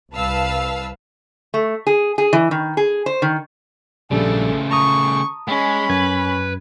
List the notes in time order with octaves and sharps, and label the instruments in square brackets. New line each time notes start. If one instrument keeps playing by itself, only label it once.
[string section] C2 B4 F5 A5 E6
[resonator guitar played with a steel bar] A3
G#4
G#4
E3
D#3
G#4
C5
D#3
[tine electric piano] A#1 G3 [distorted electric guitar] C#3 A3 [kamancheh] A4
[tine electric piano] A5 A#5 D#6 [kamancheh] C#6
[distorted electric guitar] G#3 [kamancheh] C#4 B5
[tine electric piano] F#2 G#6 [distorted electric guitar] B4